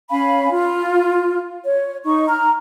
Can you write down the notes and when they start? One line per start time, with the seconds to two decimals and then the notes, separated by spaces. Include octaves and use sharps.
0.10 C#4 F5 G#5 B5
0.50 F4
1.63 C#5
2.05 D#4 C#6
2.27 A#5 F6